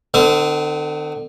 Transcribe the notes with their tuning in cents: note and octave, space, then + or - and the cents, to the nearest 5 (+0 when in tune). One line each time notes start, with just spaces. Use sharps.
D3 +40 C4 -30